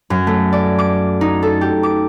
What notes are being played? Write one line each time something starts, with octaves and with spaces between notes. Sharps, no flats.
F#2
A3
D5
D6
D#4
A4
G4
D6